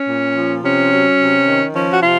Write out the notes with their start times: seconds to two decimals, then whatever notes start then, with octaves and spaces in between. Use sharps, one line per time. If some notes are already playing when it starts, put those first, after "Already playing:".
Already playing: C#4
0.08 A#2
0.36 F3
0.63 C3 C#4
0.91 F#3
1.19 C3
1.47 D#3
1.75 F3 C#4
1.92 F#4
2.02 C3 F4